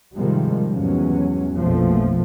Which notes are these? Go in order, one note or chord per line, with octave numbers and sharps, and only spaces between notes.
G#2 C3 D#3 F3 G3 G#3
E2 G#2 C3 F#3 C#4
A#1 F2 B2 F3 A3